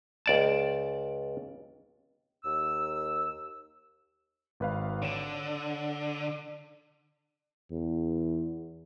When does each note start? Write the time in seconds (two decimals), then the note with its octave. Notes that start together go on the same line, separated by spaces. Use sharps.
0.26 C#2 D5 A5
2.44 D#2 E6
4.60 G#1 B4 F5
5.02 D3 C#5 E7
7.71 E2